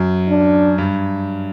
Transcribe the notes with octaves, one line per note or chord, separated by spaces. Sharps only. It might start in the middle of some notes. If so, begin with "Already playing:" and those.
Already playing: F#2
D4
G2